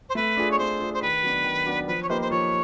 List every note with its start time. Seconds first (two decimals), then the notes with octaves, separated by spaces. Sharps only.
0.09 C5
0.15 A3 B4
0.37 D4 F4 G#4
0.51 C#5
0.58 A3 C5
0.80 D4 F4 G#4
0.94 C5
1.02 D#3 B4
1.22 F#3 B3 D4
1.44 D#3
1.66 F#3 B3 D4
1.87 F3 B4
2.02 C#5
2.09 A#3 D#4 G4 B4 C5
2.22 C5
2.31 F3 C#5